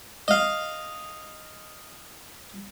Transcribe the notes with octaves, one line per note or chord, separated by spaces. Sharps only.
D#5 F5